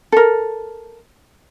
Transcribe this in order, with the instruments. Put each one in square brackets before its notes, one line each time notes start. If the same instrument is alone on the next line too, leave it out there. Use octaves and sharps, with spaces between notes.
[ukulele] A4 A#4